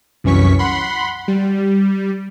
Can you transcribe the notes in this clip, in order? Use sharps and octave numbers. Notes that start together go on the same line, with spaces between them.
C2 F#2 E3 C#4 C#6 B6
F#5 B5 C6
G3